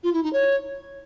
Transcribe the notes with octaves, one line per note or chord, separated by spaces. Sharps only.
F4
E4
D#4
C#5